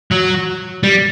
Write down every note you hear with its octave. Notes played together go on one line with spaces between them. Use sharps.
F#3
G3